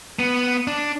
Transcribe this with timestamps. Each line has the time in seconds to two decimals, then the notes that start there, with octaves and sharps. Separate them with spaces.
0.19 B3
0.67 D4